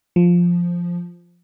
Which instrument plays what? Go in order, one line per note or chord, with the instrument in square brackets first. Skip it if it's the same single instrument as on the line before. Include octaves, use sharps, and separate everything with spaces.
[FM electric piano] F3